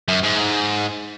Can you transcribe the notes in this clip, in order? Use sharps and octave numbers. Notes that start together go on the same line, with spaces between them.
F#2
G#2